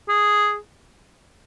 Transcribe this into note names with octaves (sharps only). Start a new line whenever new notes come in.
G#4